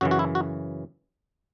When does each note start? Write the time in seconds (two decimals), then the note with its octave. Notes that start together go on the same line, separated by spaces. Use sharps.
0.01 F#2 C#3 E3 F#4
0.11 F#4
0.19 E4
0.35 F#4